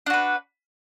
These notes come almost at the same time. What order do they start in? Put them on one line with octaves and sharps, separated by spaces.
D4 F#4 B4